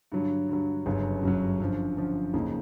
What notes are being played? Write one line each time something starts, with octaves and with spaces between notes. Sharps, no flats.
G2 D3 F#3
G2 D3 F#3
G1 F#2 C#3 F#3
G1 F#2 C#3 F#3
F#2 D3 F3
F#2 D3 F3
F2 C#3 F3 A#3 D#4